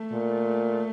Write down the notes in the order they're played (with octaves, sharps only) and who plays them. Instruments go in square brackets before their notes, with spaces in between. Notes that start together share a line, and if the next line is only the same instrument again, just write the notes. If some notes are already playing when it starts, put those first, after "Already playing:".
Already playing: [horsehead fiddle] A3
[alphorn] A#2